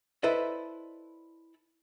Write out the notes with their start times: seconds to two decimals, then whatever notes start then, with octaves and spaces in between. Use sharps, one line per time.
0.23 E4 A4 B4 C5 D5 D#5